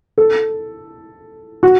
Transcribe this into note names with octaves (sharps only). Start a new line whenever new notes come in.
A4
F#4